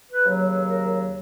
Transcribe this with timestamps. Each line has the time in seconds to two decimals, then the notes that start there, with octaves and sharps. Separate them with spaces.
0.09 B4
0.23 D#2 C#3 F#3
0.68 A#4